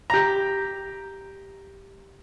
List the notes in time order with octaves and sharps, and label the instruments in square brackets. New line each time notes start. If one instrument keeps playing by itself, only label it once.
[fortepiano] G4 A#5